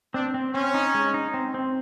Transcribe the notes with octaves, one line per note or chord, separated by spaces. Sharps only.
C4 D4
C4
C4 C#4
D#4
G#3
D#4
C4
C4